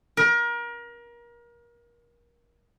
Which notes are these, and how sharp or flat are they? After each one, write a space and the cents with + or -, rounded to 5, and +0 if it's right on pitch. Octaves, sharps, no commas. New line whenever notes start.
A#4 +30